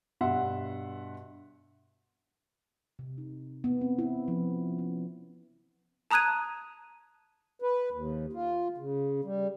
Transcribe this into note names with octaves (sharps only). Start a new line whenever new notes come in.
G2 B2 E5 F#5 C6
C3
D#4
B3
C4
E4
F3
C#4
A5 A#5 D#6 F#6 G#6 D#7
B4
D#2
F4
C#3
G3